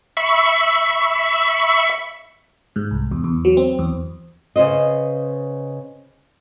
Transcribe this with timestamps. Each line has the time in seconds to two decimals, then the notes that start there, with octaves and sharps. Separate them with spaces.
0.17 E5 B5 C#6
2.76 G#2
2.91 C2
3.11 E2
3.24 E2
3.45 F#3
3.57 C4
3.79 E2
4.56 C#3 B4 C5 D#5